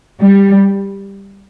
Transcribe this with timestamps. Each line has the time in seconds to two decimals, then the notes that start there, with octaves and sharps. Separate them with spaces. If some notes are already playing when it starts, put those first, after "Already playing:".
0.20 G3